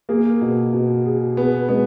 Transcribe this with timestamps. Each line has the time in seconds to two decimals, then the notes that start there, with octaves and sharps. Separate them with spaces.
0.09 A#3 G#4
0.41 B2
0.73 B2
1.05 G#4
1.37 B3 G#4
1.69 G#3 B3